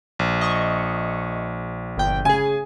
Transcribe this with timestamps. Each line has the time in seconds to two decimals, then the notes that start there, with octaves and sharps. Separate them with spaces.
0.19 A#1
0.41 D#5 C#6
1.97 G1 G5
2.25 C#3 G#4 G#5